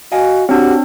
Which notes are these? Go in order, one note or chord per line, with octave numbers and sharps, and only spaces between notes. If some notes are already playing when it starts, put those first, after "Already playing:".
F#4 D#5 F5 G#5
C4 D4 F#4 G4 C#5